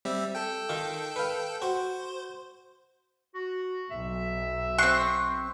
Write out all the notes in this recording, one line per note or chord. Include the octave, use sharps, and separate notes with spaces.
G3 C4 E5
A4 G5
D#3 F4
B4 F5
F#4 C5
F#4
B1 E5
C4 C#6 F#6 C7